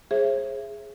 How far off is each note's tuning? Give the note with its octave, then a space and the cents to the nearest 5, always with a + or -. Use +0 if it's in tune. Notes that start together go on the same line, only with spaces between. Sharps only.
G#4 +0 C5 +45 E5 +20